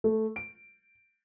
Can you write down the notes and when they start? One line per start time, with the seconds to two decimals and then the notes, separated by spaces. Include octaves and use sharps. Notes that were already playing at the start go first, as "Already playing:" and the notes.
0.04 A3
0.36 D7